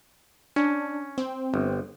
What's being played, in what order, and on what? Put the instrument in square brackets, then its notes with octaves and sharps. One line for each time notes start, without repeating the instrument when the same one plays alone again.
[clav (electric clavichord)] C#4 [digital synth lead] D4
[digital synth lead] C4
[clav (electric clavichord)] G1